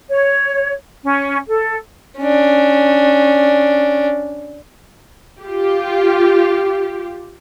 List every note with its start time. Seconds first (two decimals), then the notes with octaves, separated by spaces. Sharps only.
0.09 C#5
1.03 C#4
1.48 A4
2.18 C#4 D4
5.41 F4 G4